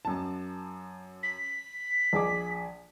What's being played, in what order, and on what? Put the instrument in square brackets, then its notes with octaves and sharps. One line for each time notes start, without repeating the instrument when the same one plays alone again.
[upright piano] F#2 A5
[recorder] B6
[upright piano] A#1 G#4 D6